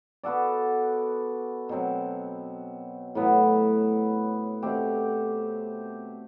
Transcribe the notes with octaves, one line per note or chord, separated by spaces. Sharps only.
B3 F#4 A4 D5
B2 F#3 C4
A2 F#3 B3
B2 A3 C4 G4